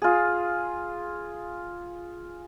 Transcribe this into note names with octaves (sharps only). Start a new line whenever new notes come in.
F4 G#4